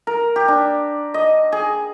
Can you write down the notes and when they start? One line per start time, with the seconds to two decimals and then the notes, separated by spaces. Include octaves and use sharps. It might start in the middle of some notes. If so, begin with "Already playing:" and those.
0.07 A#4
0.36 G4
0.48 D4
1.14 D#5
1.52 G#4